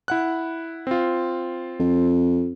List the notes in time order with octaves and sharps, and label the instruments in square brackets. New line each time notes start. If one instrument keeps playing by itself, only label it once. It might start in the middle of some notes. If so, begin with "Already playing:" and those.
[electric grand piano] E4 F#5 F#6
C4 F4
[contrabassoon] F2